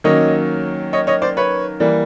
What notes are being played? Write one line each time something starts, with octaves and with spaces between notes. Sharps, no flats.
D#3 F#3 A#3 C#4 C#5 D#5
C#5 D#5
C#5 D#5
C5 D5
B4 C#5
E3 G3 A#3